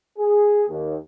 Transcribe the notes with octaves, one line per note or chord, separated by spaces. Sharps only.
G#4
D#2